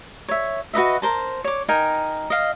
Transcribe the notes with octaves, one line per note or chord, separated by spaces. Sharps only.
C#5 E5
F#4 B4 D#5 E5
A#4 C5 A5
C#5 D6
D#4 A#4 G5 G#5
D#5 F5